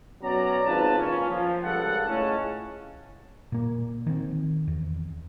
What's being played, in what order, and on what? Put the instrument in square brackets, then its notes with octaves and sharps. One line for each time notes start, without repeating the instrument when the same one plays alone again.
[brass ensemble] B2 F#3 C#4 D5 A#5
G#1 C#2 F4 B4 A5
A#2 C#4
F3
C#2 G2 A#2 A4 F#5
A2 C#3 G#3 C#4 A5
[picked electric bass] A#2 A#3
D#3 C4
E2